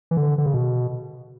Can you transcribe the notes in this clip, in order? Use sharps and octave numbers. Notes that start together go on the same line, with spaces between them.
E3
D3
D3
C#3
B2